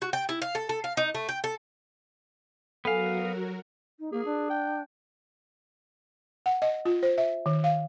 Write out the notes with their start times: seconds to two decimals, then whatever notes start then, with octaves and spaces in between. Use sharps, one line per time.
0.02 F#4
0.13 G5
0.29 E4
0.42 F5
0.55 A4
0.69 A4
0.84 F5
0.97 D#4
1.15 A3
1.29 G5
1.44 A4
2.85 F#3 B3 F#4 A4 A#4 F5 F#5 G#5
3.99 D#4
4.13 A#3 G#4
4.25 D4
4.50 G5
6.46 F#5
6.62 D#5
6.85 F4
7.03 C5
7.18 E5
7.46 D#3
7.64 F5